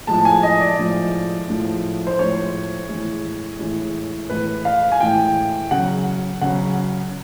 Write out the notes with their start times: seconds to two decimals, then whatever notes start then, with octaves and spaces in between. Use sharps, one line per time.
0.07 A2 F3 G#3 A5
0.25 G#5
0.43 D#5
0.61 D5
0.79 A2 F3 G#3
1.48 A2 F3 G#3
2.07 C5
2.19 A2 F3 G#3 C#5
2.89 A2 E3 G#3
3.59 A2 E3 G#3
4.30 A2 E3 G#3 B4
4.65 F5
4.92 G#5
5.00 A2 E3 G#3 G5
5.71 C#3 F#3 F#5
6.42 C#3 F#3 F#5